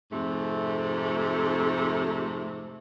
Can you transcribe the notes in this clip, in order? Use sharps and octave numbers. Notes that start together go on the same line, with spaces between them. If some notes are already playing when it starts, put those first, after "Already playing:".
F2 G#2 C3 A3